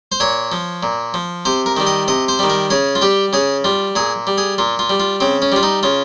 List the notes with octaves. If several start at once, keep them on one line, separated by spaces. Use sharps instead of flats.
C5
A#2 C#5
F3
A#2
F3
C3 C5
A#4
D#3 G3
D#5
C3 D#5
C5
D#3 G3
A#4
C#3 G#4
F4
G3 G4
C#3 G#4
G3 F4
A#2 G#4
G3
G#4
A#2 F4
F4
G3
F4
C#3 C4
C#4
G3 F4
D#4
C#3 F4